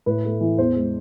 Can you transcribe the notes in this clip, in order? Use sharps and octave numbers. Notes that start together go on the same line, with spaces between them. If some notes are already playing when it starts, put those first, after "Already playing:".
A2 B4
A3
E3
E2 C5
G#3